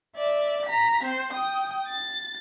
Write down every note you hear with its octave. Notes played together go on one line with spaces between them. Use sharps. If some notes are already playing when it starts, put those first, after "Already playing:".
D5 E5
A#5 B6
C4 C5
G5 D#6
A6